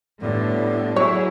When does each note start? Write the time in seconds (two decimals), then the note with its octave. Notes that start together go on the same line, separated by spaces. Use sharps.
0.21 A2 D3 G3 B3
0.96 F#3 E4 G#4 C#5